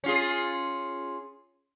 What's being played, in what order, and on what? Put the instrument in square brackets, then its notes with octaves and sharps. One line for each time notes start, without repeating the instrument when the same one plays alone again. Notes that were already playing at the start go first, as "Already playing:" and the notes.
[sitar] C#4 F4 G#4